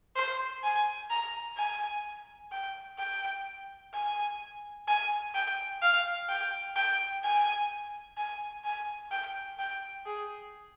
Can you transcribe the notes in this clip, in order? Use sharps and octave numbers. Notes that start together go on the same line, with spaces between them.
C5
G#5
A#5
G#5
G5
G5
G#5
G#5
G5
F5
G5
G5
G#5
G#5
G#5
G5
G5
G#4